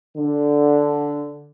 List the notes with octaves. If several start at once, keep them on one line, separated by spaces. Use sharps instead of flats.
D3